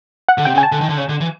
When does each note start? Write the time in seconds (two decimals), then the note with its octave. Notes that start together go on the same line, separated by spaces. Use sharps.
0.28 F#5
0.38 D3
0.45 C3 G5
0.55 C#3
0.58 G#5
0.63 A5
0.72 D3
0.81 D#3
0.89 D3
0.97 C#3
1.09 D3
1.21 E3